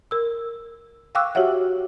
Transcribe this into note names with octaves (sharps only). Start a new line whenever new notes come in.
A#4 E6
F5 G5 C#6 D6 E6 F#6
F#4 G4 C#5 E5 F#5